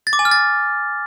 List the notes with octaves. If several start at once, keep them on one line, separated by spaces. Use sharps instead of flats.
A6
D6
G#5
F6
A6